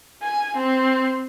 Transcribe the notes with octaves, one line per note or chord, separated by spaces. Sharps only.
G#5
C4